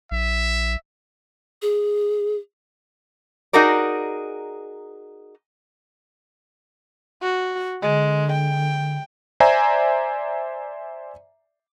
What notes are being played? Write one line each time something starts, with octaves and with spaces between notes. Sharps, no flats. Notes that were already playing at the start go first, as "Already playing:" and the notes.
A#1 E5
G#4
D#4 F#4 G#4 A#4 D5
F#4
D3 G#3
G5
C5 D5 E5 G#5 A#5